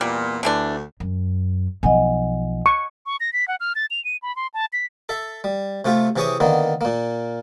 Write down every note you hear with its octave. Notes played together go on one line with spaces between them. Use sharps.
E2 A#2 G3
D2 D3 E3 D4
F#2
B1 F3 D#5 F#5 G#5
C#6
C#6
A#6
B6
F#5
F6
A6
F7
D#7
B5
C6
A5
B6
A4 E5
G3
C3 A3 F4 G4
C3 E3 G4 G#4 C#5 D#6
D3 D#3 A#3 B3
A#2 A#3